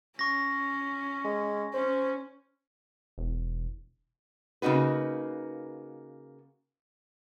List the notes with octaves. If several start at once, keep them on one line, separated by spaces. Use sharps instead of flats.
C#4 C#6 A#6
G#3
C#4 C5
E1
C#3 A#3 D#4 F#4 B4